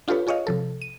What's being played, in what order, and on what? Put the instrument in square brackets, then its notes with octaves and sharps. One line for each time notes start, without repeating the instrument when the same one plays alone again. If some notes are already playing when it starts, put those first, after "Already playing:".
[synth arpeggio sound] D4 F4 G4 A4 B4 C#5
F4 G#4 C#5 D#5 F5
C3 F3 A4
D#7